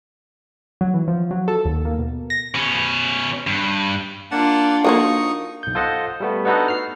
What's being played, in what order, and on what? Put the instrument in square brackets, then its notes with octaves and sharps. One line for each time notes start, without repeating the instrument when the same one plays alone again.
[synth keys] F#3
E3
F3
F#3
A4
D#2
A#3
B2
A#6
[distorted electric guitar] B2 C#4
G2
[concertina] A#3 F#5 A5 [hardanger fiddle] D4 F4
[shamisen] F3 A#3 F#4 [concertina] D#4 C#6 D#6
[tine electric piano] B1 G6
F4 A4 C5 D#5 F#5
G3 A3 B3
B3 D4 D#4 F#4 A4 B4
F6 C7